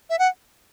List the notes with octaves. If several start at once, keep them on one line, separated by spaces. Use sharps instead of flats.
E5
F#5